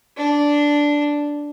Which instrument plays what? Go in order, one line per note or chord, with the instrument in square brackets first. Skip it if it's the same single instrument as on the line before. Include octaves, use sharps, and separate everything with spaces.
[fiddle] D4